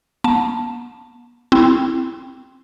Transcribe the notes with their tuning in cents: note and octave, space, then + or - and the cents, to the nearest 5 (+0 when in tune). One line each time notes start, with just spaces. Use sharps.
B3 -40 A5 +0
C4 +0 E4 +0